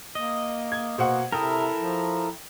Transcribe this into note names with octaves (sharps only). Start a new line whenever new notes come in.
A#3 D#5
G#6
B2 A#3 C5 F#5
C3 E4 A4 A#4 G5 D#6
F3